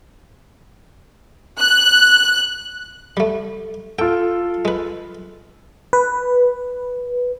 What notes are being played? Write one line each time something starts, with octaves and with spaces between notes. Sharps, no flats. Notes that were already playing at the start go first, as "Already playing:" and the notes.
F#6
G3 A3
F4 A4 G5
G#3 B4
B4